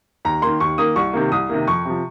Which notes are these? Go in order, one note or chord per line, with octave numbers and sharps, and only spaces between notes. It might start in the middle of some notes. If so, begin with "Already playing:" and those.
D#2 A#5
D#3 A#3 C6
D#2 C#6
D#3 A#3 D#6
C2 C#6
C3 D#3 A#3
C2 D#6
C3 D#3 A#3
F2 C#6
C3 F3